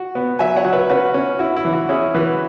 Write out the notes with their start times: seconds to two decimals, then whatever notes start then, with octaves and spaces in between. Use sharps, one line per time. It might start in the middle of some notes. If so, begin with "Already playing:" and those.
Already playing: F#4
0.15 B3
0.39 F#3 E5 G#5
0.56 C#5 F#5
0.65 F#3
0.73 B4 E5
0.90 C#4 F#4 B4
1.14 C#4
1.39 E4 F#4
1.56 E4
1.65 E3
1.73 F#4
1.89 C#4 E4 G#4
2.14 E3 F#4 B4